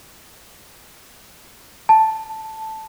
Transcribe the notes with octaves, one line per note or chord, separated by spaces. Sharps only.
A5